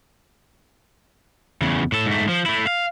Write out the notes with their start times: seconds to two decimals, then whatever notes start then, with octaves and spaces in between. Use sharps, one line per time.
1.62 E2 C#3
1.92 A2 A4
2.06 G#2 A3
2.29 F3
2.46 A3 E4
2.67 F5